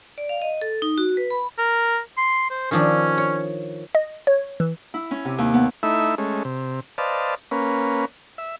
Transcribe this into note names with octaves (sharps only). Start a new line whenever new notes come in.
D5
F5
D#5
A4
D#4
F#4
B4
B5
A#4
C6
C5
D#3 F3 C#4 D4
C#5
D#5
C#5
E3
E4
C#4
C3
D#2
B3
A3 D#4 E4 E5
G#3 A3 C#4
C3
B4 C5 D5 D#5 F5 A5
A#3 C#4 B4
E5